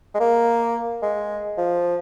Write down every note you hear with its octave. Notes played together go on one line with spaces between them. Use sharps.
G#3
A#3
G#3
F3